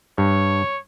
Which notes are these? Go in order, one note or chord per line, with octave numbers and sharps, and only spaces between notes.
G2 C#5